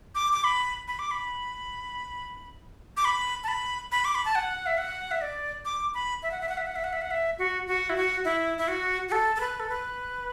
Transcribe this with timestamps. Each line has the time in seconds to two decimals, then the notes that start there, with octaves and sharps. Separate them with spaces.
0.15 D6
0.33 D6
0.44 B5
0.88 B5
0.99 D6
1.11 B5
2.97 D6
3.05 B5
3.44 A5
3.48 B5
3.92 B5
4.05 D6
4.15 B5
4.25 A5
4.35 F#5
4.66 E5
4.78 F#5
5.11 E5
5.21 D5
5.65 D6
5.94 B5
6.23 E5
6.31 F#5
6.41 E5
6.49 F#5
6.57 E5
6.67 F#5
6.76 E5
6.84 F#5
6.93 E5
7.02 F#5
7.11 E5
7.38 F#4
7.67 F#4
7.90 E4
7.96 F#4
8.25 E4
8.58 E4
8.68 F#4
9.08 F#4
9.12 A4
9.36 A4
9.40 B4
9.60 A4
9.69 B4